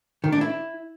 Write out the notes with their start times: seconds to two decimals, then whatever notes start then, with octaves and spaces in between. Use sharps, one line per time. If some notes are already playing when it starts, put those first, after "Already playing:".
0.24 D#3
0.32 D4
0.41 E4